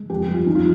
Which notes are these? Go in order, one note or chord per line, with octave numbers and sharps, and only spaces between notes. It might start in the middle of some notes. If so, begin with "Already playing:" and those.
Already playing: G#3
F2 G4
G4
G3
F4
F2 D#4
F4